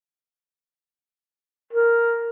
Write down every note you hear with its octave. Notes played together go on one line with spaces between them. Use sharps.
A#4